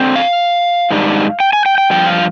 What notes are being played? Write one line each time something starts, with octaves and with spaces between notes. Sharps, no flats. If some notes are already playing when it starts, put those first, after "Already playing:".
Already playing: D3 C4
F5
G#2 D#3 G3 D4
G5
G#5
G5
G5
G2 F3 G5
F5